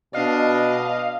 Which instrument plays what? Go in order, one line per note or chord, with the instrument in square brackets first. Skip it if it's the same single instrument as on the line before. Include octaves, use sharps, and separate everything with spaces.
[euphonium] B2 [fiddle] D4 [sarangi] D#5 [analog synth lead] F5